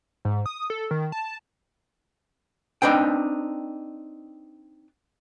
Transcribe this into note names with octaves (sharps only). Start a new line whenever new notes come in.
G#2
D#6
A4
D#3
A5
C4 D4 D#4 B4 G5